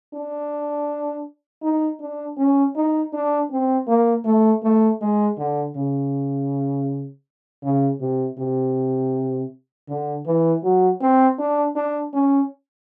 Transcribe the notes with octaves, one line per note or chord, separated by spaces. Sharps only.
D4
D#4
D4
C#4
D#4
D4
C4
A#3
A3
A3
G#3
D3
C#3
C#3
C3
C3
D3
E3
F#3
C4
D4
D4
C#4